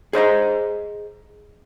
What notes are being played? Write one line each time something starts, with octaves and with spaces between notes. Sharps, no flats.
G#4 C5 D#5 A#5